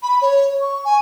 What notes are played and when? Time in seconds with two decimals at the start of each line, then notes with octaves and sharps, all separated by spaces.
0.03 B5
0.22 C#5
0.61 C#6
0.85 G#5